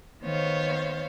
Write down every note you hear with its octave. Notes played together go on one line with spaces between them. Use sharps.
D#3 B3 C5 C#5 F5